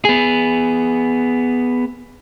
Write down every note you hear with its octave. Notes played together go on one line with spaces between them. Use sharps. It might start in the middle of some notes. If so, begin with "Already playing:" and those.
B3 G#4